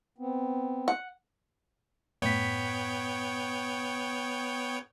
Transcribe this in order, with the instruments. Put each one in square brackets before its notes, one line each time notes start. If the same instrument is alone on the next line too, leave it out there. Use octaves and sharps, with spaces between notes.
[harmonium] B3 C4
[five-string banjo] F#5
[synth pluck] F#2 A2 B6 [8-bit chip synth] B3 C#5 G5